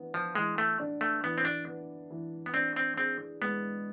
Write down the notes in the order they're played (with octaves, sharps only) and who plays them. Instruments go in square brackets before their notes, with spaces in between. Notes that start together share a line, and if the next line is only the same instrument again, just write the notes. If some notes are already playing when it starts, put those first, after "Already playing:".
Already playing: [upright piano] E3 B3 D4
[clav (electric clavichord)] F3
[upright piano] E3 [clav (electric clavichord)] G#3
[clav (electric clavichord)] A3
[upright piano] D4
[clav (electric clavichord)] A3
[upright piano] E3 [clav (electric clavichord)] B3
[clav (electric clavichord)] C4
D4
[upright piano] B3
E3
[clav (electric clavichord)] B3
[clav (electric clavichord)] C4 [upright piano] D4
[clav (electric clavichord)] C4
[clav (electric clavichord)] C4 [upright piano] G#4
[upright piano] G#3 [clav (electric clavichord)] B3